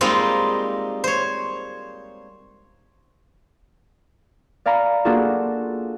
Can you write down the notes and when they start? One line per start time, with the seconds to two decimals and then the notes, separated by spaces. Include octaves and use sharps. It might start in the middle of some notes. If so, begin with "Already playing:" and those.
0.01 G3 G#3 A#3 C4 D#4 F4
1.04 C5 C#5
4.66 D5 F5 G#5 A#5 B5
5.05 A#3 D4 F4 F#4 G#4 A4